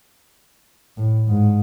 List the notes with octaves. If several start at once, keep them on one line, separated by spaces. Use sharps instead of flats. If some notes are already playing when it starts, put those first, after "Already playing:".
A2
G#2